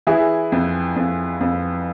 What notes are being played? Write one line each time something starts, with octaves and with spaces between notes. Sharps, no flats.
E3 E4 G#4
F2
F2
F2